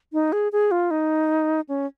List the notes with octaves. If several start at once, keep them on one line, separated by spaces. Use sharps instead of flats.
D#4
G#4
G#4
F4
D#4
C#4